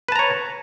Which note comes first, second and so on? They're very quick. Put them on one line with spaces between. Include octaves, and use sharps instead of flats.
B4 A5 A#5 C#5